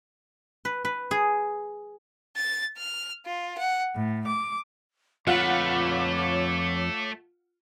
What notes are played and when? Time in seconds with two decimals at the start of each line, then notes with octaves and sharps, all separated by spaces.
0.65 B4
0.85 B4
1.11 G#4
2.36 A6
2.76 F6
3.25 F4
3.57 F#5
3.96 A2
4.26 D6
5.27 F2 A3 F4 B4 C#5 F#5 D6